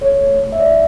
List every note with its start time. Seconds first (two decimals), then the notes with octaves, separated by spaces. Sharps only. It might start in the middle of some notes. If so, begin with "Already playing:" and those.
0.01 A4 C#5
0.21 A3
0.40 A3
0.52 E5
0.60 E4 D5